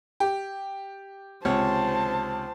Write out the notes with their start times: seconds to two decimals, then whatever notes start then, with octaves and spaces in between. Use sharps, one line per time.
0.20 G4
1.45 C#2 C3 C5 C#5 A5